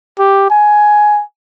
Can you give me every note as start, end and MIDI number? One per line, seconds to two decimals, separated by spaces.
0.19 0.50 67
0.50 1.22 80